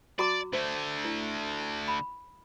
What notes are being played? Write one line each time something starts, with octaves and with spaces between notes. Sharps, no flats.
F#4 D5 A#5 D6
D3 A3 C5
E4
B5